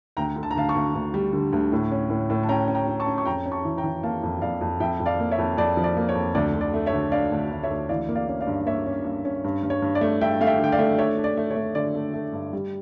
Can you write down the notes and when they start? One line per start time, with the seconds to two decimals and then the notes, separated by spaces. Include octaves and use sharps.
0.17 D2 G5 A#5
0.36 D3
0.43 A5
0.51 A#5
0.55 D2 F5 A5
0.69 A5 C#6
0.75 D2
0.95 D2
1.14 G3
1.33 D3
1.53 D2
1.72 A2
1.92 C#4
2.10 A2
2.30 A2
2.43 A5
2.49 C#4 G5 A#5
2.68 C#4
2.75 G5 A#5
2.87 C#4
3.00 A5 C#6
3.07 C#4
3.18 C#6
3.25 F2 G5 A#5
3.46 C#4
3.51 A5 C#6
3.65 E3
3.78 G5 A#5
3.84 E3
4.03 A#3 F5 A5
4.23 F2
4.42 F2 D5 F5
4.61 F2
4.80 F2 E5 G5
5.00 F2
5.06 D5 F5
5.19 A#3
5.31 C#5 E5
5.38 F2
5.57 F2 D5
5.77 F3
5.84 D5
5.97 A#3
6.09 C#5
6.15 F2
6.35 D2 D5
6.54 D3
6.61 D5
6.74 A3
6.86 C#5 E5
6.93 D2
7.12 D4 D5 F5
7.32 D2
7.51 D2
7.63 C#5 E5
7.70 D2
7.89 E3 D5 F5
8.09 A#3
8.15 D5 F5
8.28 C#4
8.41 D5 F5
8.47 G2
8.66 A#3 C#5 E5
8.86 C#4
9.05 G2
9.25 C#4
9.44 G2
9.63 G2
9.70 C#5
9.82 G2
9.95 D5
10.01 A3
10.21 G2 E5 G5
10.41 A3 F5
10.47 E5 G5
10.60 D3 G5
10.72 D5 F5
10.79 A3
10.98 D4 C#5 E5
11.17 D4
11.24 D5
11.37 A3
11.50 C#5
11.56 A3
11.75 D3 D5
11.95 A3
12.14 A3
12.33 G2
12.53 G3